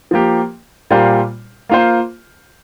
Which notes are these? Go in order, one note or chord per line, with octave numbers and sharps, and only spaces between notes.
F3 A#3 G4
A#2 G3 A#3 F4 C5
A#3 F4 C5